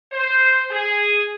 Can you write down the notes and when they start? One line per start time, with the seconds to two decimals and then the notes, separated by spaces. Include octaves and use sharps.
0.12 C5
0.71 G#4